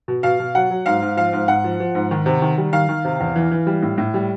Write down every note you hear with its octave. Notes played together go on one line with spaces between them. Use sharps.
B2
B2 F5
B2
F#3 F#5
F#3
G#2 F5
G#2
F3 F5
G#2
G#2 F#5
F3
F3
G#2
D#3
C3
D#3
G3
D#3 F5
D#3
C3
E2
E3
E3
G3
A2
A2
G3